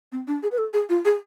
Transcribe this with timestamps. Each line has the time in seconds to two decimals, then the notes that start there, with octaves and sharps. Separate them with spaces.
0.12 C4
0.27 D4
0.43 G#4
0.52 B4
0.58 A4
0.73 G#4
0.89 F4
1.05 G#4